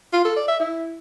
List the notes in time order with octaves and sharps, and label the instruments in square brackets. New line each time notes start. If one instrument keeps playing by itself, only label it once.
[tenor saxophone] F4
A4
D5
E5
E4